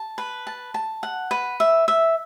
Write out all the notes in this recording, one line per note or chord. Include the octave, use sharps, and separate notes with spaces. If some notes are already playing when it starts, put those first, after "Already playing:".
Already playing: A5
B4
A5
A5
F#5
B4
E5
E5